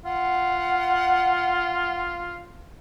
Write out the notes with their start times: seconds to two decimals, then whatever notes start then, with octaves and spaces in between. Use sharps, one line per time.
0.05 F4 F#5